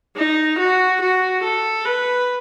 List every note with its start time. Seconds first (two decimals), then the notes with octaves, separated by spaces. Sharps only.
0.16 D#4
0.59 F#4
1.01 F#4
1.43 A4
1.85 B4